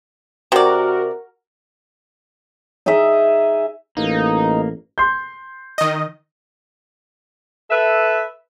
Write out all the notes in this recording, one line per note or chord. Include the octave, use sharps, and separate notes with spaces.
C3 F#4 A#4 D5
D#4 G#4 D#5 E5
A1 A#3 D#4
C6 G6
D#3 D#5
A4 B4 E5